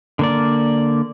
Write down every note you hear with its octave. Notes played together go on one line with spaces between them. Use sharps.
D3 A#3 D5